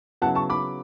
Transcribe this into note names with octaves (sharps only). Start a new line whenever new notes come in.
C#3 F#3 B3 E4 F#5 A5
A5 C#6
B5 D6